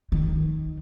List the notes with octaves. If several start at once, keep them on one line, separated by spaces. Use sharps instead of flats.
D#3